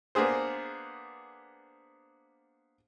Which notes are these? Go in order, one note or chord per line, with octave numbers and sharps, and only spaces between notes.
A#3 B3 D4 G#4 C5